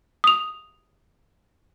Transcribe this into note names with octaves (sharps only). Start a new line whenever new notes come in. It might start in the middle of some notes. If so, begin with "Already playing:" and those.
D#6 F7